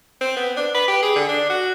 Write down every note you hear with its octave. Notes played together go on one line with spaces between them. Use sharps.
C4
B3
D4
B4
G4
G#4
D3
D4
F#4